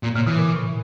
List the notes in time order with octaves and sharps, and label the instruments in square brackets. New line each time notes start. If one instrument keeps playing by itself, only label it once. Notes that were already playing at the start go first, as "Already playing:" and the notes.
[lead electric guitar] A#2
[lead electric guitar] A#2 [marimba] C#3
[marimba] B2 [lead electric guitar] E3
[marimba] A#2
A2